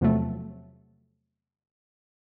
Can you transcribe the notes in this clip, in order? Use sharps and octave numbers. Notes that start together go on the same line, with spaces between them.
E2 C3 F3 F#3 A3